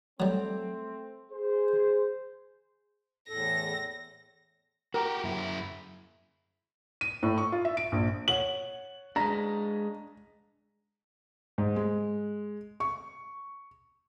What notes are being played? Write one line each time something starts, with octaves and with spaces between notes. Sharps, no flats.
F#3 G3 A3 C4
G#4 C5
E2 A2 A4 A#6
F#4 G4 A#4
F#2 E4
D#7
A2
C#6
F4
E5
D7
A#1
C#5 F#5 F#7
G#3 D4 A#5 A#6 B6
G#2
G#3
C#6